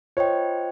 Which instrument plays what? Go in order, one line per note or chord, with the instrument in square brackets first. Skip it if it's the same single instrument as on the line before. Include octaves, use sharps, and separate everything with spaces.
[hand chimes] F4 C5 D#5 G5 [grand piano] C#5